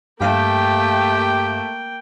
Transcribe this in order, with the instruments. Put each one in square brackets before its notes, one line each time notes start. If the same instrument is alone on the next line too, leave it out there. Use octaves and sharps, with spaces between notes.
[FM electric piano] G2 F5 [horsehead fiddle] A3 [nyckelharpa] A#3 G5 [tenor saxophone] G4